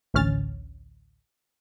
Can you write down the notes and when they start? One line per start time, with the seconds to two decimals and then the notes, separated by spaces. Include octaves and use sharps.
0.14 A1 D2 C#4 F6 A6